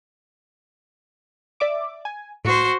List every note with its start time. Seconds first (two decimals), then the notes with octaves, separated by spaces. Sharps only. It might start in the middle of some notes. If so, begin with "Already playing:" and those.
1.60 D5 E5 D6
2.05 G#5
2.45 A2 F#4 C5